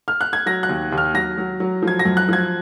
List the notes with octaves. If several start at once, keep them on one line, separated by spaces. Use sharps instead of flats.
F6
F#6
G#6
F#3 A#6
F#6
D#2
D#2
F6
F#3 A#6
F#3
F#3
F3
G#6
A#6
F#2
F#6
F3 G#6